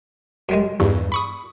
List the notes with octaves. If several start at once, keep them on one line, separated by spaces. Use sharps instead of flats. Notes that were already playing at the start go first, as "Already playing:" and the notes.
F#2 G3 G#3
E2 G2
B5 C#6 D#6